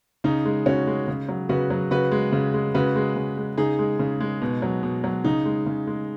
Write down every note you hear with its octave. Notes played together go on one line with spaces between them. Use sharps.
C#3 D#4
G#3
C#3 C#4 F#4
G#3
C#3
F#3
C#3 F#4 B4
F#3
C#3 F#4 B4
G#3
C#3
G#3
C#3 F#4 B4
G#3
C#3
G#3
C#3 D#4 G#4
G#3
C#3
G#3
B2
F#3
B2
F#3
C#3 D#4
G#3
C#3
G#3